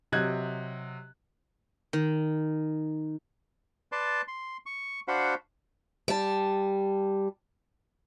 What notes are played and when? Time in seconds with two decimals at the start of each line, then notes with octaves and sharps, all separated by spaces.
0.12 C3 F#3 D#5 F#6 G#6
1.93 D#3
3.92 B4 D5 A5 C6
4.28 C6
4.66 C#6
5.08 D4 F#4 C5 F5 F#5 B5
6.08 G3 A5